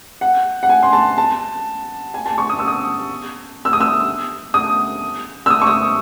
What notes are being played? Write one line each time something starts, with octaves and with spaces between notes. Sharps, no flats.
F#5
F#5
G#5
C6
A5
A5
G#5
A5
C#6
D#6
E6
D#6
E6
D#6
E6
D#6
E6
D#6
C#6
D#6